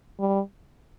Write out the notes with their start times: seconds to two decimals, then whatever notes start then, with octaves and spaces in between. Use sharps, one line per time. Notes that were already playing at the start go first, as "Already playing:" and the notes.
0.20 G3